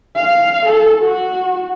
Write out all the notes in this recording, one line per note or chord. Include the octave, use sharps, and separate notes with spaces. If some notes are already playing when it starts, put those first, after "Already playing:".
F5
A4
F#4